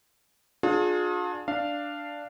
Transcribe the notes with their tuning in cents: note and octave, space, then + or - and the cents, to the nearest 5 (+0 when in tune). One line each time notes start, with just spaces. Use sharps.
D4 +15 F4 +40 G#4 +20
D4 +0 F5 -10